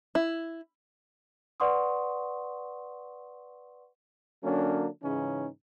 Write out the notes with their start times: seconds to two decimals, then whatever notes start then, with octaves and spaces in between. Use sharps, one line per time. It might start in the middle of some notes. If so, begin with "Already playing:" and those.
0.15 E4
1.60 B4 D5 F#5 C6 C#6 D#6
4.44 D3 F#3 A#3 C#4 D4
5.04 G#2 C#3 E3 C#4 D#4